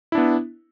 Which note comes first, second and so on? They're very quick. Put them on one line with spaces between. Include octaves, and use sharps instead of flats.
E4 D4 B3